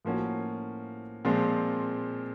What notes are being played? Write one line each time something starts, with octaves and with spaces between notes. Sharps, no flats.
A2 F3 A#3 C#4 F#4
A#2 F3 G#3 C4